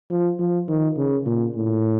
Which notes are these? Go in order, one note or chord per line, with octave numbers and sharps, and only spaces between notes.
F3
F3
D#3
C#3
A#2
A2